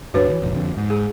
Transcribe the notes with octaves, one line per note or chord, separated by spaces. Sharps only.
D1 G2 D4 F#4 B4 C#5
D3 E3
F1 A#1 A#2
F2 D3
G#2
G#4